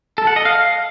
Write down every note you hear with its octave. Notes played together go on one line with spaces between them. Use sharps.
A4
F#5
D#5
F5